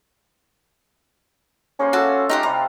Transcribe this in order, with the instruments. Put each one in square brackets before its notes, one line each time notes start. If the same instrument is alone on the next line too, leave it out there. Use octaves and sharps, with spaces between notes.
[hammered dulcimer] A#3 G#4 C5 [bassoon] C#4
[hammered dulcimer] F4 A4 E5 [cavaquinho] F#4 A5
[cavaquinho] D#4 G4 D#6 [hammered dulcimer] F4 E5 F#5
[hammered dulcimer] C3 G3 G4 [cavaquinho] A#5